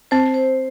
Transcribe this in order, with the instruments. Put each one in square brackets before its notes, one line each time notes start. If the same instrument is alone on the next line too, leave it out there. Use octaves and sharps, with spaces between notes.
[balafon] C4 [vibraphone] C5
[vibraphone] C5